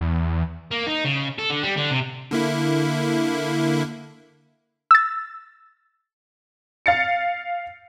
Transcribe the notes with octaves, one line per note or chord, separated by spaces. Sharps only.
E2
A#3
D#4
C#3
A4
D3
G3
D3
C3
D3 A#3 E4
E6 A6
F5 A6 C#7